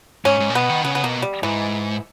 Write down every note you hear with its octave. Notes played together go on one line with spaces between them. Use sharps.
G#2 C#4
G#2
A#2
B2 B3
D#3
C#3 B3
B3
B2 A#3
G3
G#2 E3